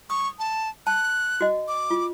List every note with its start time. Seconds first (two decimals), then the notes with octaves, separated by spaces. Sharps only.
0.10 C#6 D#6
0.39 A5
0.87 A5 F#6
1.41 F#4 D#5
1.68 D6
1.91 F4